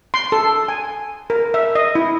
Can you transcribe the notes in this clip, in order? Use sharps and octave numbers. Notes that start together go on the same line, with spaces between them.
C6
A4
G#5
A#4
E5
D#5
E4